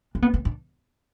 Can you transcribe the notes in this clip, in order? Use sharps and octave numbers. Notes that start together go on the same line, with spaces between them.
D4
B3
B3
D4